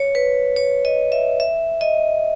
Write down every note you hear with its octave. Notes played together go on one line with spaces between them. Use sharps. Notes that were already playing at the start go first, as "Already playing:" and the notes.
Already playing: C#5
B4
C#5
D#5
E5
E5
D#5